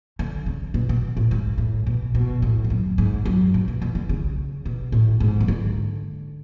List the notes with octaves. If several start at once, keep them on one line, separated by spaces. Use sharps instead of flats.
D3
C#3
B2
B2
A2
G#2
A2
B2
B2
A2
G#2
F#2
G#2
F#2
G#2
B2
E3
D3
C#3
B2
A2
G#2
E3
D3